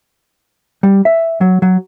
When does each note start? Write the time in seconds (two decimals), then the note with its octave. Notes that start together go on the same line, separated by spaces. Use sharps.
0.83 G3
1.05 E5
1.41 F#3
1.62 F#3